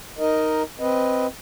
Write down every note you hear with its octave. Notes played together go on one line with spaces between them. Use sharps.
D#4 A#4 D#5
C4 B4 D#5